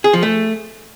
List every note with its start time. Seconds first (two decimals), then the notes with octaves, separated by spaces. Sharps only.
0.04 G#4
0.13 F3
0.23 A3